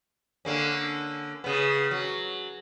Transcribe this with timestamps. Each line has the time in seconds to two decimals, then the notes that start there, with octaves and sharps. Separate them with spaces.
0.45 D3 A#3 C#4
1.44 C#3 B3
1.91 F#3